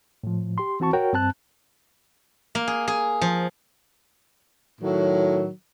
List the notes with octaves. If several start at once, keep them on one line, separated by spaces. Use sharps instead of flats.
A2 F3
G4 C6
E3 C4 F#4 A5 C#6
F#4 A#4 C#5 G5
G2 C4 A5 F#6
A#3
G#4
G#4
F3
A2 D#3 F#3